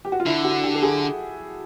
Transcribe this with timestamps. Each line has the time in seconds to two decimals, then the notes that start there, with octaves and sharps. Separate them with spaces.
0.05 G4
0.12 F#4
0.20 F4
0.26 D3 E4
0.44 F#4
0.64 G4
0.75 A4
0.83 G#4